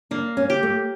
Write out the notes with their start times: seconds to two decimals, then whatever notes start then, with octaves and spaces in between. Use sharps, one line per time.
0.11 A#3 D4
0.37 C#4
0.50 G4
0.63 A3